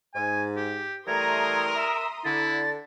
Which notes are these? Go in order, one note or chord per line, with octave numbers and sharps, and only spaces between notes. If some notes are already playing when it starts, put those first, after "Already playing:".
G#2 G#5
G4
E3 G3 A3 A#4 A#5 C6 D#6 G#6
E5
D3 E4 A6